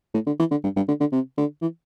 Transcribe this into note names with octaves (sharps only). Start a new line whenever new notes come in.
A2
D3
E3
D3
G2
G2
D3
D3
C3
D3
E3